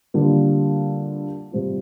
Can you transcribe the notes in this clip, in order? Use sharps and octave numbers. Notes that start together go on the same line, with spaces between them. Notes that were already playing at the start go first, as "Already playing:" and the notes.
D3 G3 A#3 F4
C3 G3 C4 F4